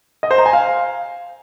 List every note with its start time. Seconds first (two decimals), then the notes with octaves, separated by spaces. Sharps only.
0.23 D#5
0.31 C5
0.38 A#5
0.46 G#5
0.53 F5